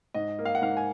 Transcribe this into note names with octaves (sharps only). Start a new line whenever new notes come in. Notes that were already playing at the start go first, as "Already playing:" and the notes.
G#2 D#5
A#3
F5
F#5
G#2 F5
G#5